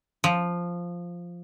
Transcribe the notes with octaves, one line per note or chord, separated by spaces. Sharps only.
F3